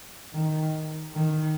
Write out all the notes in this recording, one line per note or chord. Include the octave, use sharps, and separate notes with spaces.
D#3
D#3